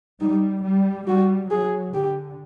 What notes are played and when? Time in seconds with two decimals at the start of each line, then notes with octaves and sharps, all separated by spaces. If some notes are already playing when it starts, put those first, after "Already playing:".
0.21 G3 D#4
0.65 G3
1.07 G3 F#4
1.50 F#3 G#4
1.94 D3 G4